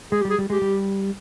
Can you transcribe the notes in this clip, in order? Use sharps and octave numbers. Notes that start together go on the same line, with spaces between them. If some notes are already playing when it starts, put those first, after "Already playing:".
G#3 G#4
G3 G4
G#4
G3
G#3 G4
G3